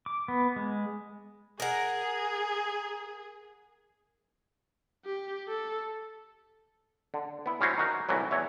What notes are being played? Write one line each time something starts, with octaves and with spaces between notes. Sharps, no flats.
D6
B3
G#3
G#4 A#4 F#5
G4
A4
D3
B3 E4
G3 C#4 E4 F#4 C5
D#4 F#4 A#4
C2 A2 E3 F#3
E2 C#5 E5